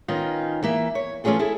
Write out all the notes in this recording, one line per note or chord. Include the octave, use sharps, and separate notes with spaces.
D#3 B3 C#4 D#4 F4
E3 A#3 E5
C#5
E3 A3 C#4 F4 G#4 A4
E4 G#4 A4